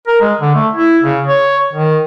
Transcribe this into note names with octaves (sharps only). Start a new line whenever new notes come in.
A#4
G#3
D3
A3
E4
C#3
C#5
D#3